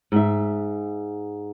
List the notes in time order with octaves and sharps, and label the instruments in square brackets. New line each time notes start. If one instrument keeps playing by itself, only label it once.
[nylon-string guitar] G#2 E5